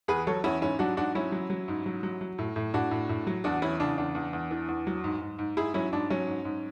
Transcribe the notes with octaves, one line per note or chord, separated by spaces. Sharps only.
E2 G#4 B4
F#3 A4 C#5
E2 C#4 E4
G#2 C#4 E4
F#3 D4 F#4
G#2 D4 F#4
F#3 C#4 E4
F#3
F#3
G#2
F#3
F#3
F#3
A2
A2
A2 D4 F#4
A2
A2
F#3
E2 D4 F#4
E3 C#4 E4
C#3 D4
E2 D4
E2
E2
E3
E2
F#3
G#2
G#2
G#2
G#2 E4 G#4
F#3 C#4 E4
G#2 D4
F#3 C#4
G#2
G#2